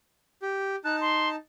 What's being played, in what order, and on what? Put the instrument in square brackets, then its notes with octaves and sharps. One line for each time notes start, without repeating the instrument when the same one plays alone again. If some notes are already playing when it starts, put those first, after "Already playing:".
[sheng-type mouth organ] G4
[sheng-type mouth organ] D#4 A5 [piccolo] F#6
[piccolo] C6